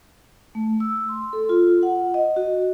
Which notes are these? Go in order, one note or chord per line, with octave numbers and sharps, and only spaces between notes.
A3
E6
C6
A4
F4
F#5
D#5
F#4